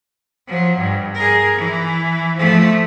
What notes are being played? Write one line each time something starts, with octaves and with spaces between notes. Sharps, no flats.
F3 F#3
G2
G#4 A#4
E3
F3 A3